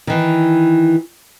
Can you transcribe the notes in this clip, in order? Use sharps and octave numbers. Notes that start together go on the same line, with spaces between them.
D#3 E3